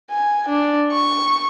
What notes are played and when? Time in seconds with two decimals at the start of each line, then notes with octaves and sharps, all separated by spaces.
0.11 G#5
0.49 D4
0.92 C#6